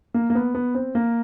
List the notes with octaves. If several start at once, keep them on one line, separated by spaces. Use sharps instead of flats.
A#3
A#3
B3
B3
C4
A#3